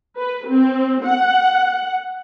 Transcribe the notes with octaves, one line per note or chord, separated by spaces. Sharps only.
B4
C4
F#5